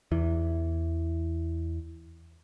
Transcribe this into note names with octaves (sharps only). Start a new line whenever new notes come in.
E2 E3